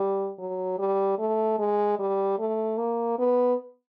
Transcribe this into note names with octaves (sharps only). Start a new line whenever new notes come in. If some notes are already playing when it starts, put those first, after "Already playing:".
Already playing: G3
F#3
G3
A3
G#3
G3
A3
A#3
B3